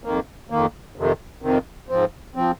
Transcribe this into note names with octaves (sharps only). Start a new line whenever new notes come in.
F2 D#3 A#3
F2 D#3 A#3
F2 C3 D#3
F2 C3 D#3
G#2 F3 C4
F3 C4